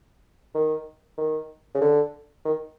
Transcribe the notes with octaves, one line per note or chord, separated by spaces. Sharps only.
D#3
D#3
C#3
D3
D#3